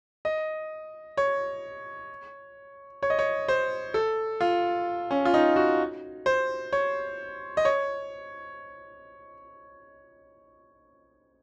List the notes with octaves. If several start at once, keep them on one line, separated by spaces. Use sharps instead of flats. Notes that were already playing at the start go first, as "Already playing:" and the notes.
D#5
C#5
C#5
D#5
C#5
C5
A4
F4
C#4
F4
D#4
F#4
C5
C#5
D#5
C#5